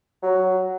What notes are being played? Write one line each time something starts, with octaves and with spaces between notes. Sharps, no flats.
F#3